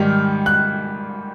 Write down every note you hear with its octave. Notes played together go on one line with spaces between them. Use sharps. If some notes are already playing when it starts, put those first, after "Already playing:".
Already playing: G#2 D#3 G3 F6
F#6